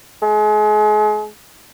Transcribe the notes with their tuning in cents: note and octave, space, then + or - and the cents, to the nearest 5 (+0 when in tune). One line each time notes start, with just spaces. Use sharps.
G#3 +35